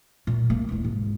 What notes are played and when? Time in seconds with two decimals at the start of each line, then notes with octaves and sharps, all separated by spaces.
0.27 A#2
0.50 A#3
0.69 E1 E2
0.85 G#2